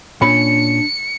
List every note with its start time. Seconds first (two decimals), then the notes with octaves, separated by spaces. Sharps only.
0.21 A#2 C#4 D4 B5 C#7